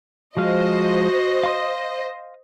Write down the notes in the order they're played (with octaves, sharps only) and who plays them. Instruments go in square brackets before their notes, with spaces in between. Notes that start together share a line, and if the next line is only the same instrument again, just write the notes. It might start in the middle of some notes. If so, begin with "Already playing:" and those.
[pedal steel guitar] F3 G#3 F5 [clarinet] F#4 [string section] C5 D#5
[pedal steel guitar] F5 C6 D#6